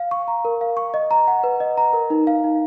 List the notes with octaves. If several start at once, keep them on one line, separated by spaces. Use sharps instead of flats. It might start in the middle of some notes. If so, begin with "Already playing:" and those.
Already playing: F5
C#6
A#5
A#4
F5
C#6
D#5
A#5
F#5
B4
D#5
A#5
A#4
D#4
F5
D#4